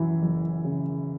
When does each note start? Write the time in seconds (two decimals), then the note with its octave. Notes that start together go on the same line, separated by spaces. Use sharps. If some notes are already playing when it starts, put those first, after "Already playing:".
Already playing: F#2 E3
0.22 F#1
0.64 C#3